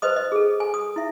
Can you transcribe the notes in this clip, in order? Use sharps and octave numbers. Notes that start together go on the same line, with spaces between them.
B4 C5 D#5 D#6
D#5
G#4 A4
G#5
D#6
E4 E5